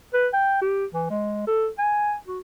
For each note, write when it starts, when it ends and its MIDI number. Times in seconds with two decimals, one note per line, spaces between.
0.14 0.28 71
0.33 0.57 79
0.61 0.85 67
0.94 1.08 52
1.10 1.44 56
1.47 1.68 69
1.78 2.14 80
2.27 2.39 66